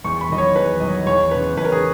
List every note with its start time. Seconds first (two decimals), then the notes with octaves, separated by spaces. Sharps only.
0.04 E2 C#6
0.21 B5
0.29 D#3 F#3 D#5
0.38 C#5
0.55 E2 B4
0.80 D#3 F#3 D#5
1.06 E2 C#5
1.31 C#3 G#3 B4
1.57 E2 B4
1.65 A#4
1.72 G#4